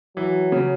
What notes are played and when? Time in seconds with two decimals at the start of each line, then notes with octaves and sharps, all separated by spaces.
0.16 E3 F#3
0.52 C#3